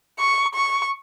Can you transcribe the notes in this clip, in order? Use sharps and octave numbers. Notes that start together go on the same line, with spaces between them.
C#6
C#6